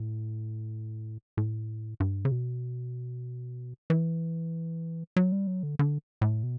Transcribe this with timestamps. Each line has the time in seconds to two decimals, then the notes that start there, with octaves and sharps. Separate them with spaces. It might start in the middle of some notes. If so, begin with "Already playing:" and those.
Already playing: A2
1.37 A2
2.00 G2
2.25 C#3
2.31 B2
3.90 E3
5.16 F#3
5.32 G3
5.47 F#3
5.63 D3
5.79 D3
6.21 A2
6.43 B2